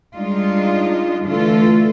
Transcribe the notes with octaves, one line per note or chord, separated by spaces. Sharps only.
G3 G#3 D4 D#4 F4
D3 E3 A3 F4 A4